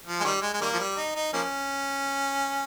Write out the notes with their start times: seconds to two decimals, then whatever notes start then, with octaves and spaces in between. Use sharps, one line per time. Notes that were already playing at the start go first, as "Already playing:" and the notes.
0.07 F3
0.20 G#3
0.25 D#3 G3
0.42 G#3
0.54 G#3
0.61 D#3 G3 A#3
0.73 F3
0.79 G3
0.97 D#4
1.15 D#4
1.33 F3 A#3 C#4